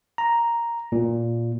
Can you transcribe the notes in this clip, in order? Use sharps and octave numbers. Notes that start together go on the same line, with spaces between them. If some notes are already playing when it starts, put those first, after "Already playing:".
A#5
A#2